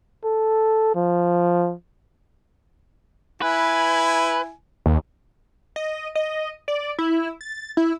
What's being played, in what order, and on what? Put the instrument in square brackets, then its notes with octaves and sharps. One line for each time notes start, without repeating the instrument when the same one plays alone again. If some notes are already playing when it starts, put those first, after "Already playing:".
[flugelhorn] A4
F3
[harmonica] E4 G#5 [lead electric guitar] B4
[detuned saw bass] D#2
[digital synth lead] D#5
D#5
D5
E4
A6
E4